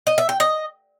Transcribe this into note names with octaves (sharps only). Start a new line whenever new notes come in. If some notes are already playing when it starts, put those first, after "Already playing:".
D#5
E5
G5
D#5